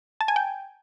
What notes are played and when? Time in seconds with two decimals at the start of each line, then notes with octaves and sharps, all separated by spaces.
0.21 A5
0.28 G#5
0.36 G5